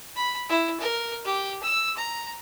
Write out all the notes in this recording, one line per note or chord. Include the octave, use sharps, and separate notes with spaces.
B5
E4
A#4
G4
E6
A#5